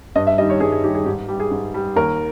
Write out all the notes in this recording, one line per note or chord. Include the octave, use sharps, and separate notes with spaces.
G2 D#5
E5
D#3 G3 D#5
C#5
G2 G#4
G#4
D#3 G3 G4
G#4
G#2 G4
G3 G4
G#4
G#2
G3
D#2 A#4